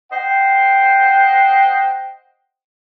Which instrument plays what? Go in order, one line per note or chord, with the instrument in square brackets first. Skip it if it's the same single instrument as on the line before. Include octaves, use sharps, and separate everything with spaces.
[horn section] C5 D#5 F#5 G5